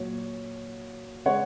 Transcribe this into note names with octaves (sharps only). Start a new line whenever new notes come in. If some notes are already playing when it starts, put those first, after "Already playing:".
Already playing: A#2 F#3 C#5
C#3 G#3 C#5 F#5